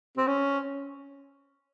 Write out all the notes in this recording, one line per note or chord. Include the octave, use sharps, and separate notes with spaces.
C4
C#4